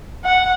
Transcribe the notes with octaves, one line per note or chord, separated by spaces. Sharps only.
F#5